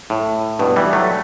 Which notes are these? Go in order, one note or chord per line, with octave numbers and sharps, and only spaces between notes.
A2
G2 B2
E3 G3
F#3 A3